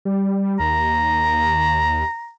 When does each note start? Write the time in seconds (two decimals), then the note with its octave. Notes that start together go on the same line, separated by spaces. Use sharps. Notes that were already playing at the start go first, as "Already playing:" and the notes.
0.05 G3
0.60 D#2 A#5